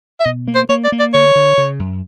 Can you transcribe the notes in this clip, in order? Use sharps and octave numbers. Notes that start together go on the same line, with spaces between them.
E5
B2 D#5
A#3
C5
A#3 C#5
D5
A#3
D5
D3 C#5
D3
C#3
F#2